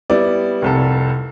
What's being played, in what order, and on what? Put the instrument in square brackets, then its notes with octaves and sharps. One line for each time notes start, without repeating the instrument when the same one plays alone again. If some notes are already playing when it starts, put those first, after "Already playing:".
[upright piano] G3 B3 E4 D5
F1 C2 A4